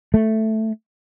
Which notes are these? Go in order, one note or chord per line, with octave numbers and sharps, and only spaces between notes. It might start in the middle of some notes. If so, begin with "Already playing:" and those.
A3